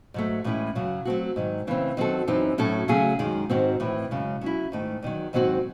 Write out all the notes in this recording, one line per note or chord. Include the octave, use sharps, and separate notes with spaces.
G#2 F#3 A3
A2 E3 G#3 C#4 E4
F#2 C#3 F#3
F#3 A3 C4 F#4
G#2 D#3 F#3
C#3 E3 A3 C4
D#3 F#3 C4 F#4 A4
F#2 E3 C4 D#4
A2 F#3 C#4 F#4 A4
C#3 F#3 A3 C#4 G#4
F#2 D#3 G#3
G#2 D#3 G#3 C4 F#4
A2 E3 C4
F#2 C#3 G#3
F#3 C#4 E4
G#2 D#3 A3
E2 D#3 F#3
G#2 D#3 F#3 C4 F#4